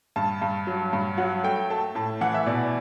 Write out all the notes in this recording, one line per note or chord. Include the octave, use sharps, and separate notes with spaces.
G2 A5
G2
F#3
G2
F#3 F#5
A3 G5
A3 A5
A2 A5
E3 F#5
E5
B2 D5